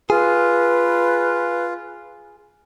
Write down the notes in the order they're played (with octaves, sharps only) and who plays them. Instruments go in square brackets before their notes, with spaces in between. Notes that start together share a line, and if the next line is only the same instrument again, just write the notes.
[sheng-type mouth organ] F4 [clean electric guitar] G#4 [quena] B4